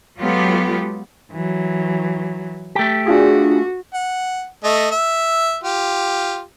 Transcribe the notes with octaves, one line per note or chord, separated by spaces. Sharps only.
F#3 G#3 B3 F4 G4 A4
E3 F#3
A3 G4 B6
D4 F4 F#4 G#4
F#5
A3 D#5
E5
F4 G4